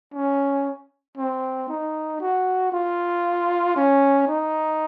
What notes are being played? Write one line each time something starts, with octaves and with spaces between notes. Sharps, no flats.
C#4
C4
D#4
F#4
F4
C#4
D#4